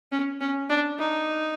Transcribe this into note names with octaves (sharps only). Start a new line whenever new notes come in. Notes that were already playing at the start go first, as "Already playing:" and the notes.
C#4
C#4
D4
D#4